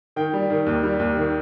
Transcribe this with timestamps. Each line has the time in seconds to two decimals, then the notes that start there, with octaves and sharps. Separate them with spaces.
0.16 D#3 G5
0.34 G3
0.50 D#3
0.66 D#2
0.83 G3
0.99 D#2
1.17 D#3